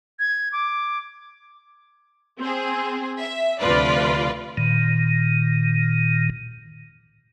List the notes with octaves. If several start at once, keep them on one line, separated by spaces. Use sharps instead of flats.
G#6
D6
C4 G#4
E5
D2 C3 F3 F4 B4 D5
A#2 D#3